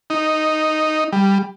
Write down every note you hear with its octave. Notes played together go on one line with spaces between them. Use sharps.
D#4
G3